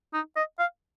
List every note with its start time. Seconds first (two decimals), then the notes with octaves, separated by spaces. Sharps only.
0.14 D#4
0.36 D#5
0.59 F5